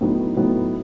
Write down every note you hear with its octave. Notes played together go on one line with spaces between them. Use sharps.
A2 F#3 B3 D#4
A2 F#3 B3 D#4